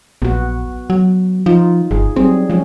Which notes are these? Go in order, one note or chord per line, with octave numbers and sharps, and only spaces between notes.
A#1 B3 F#4
F#3
F3 D#4 F4
G1 G#4
F#3 G3 C4 G#4
F3 G#3 C#4